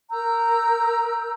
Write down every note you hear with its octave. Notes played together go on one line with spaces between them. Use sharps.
A#4 A#5 E6 G6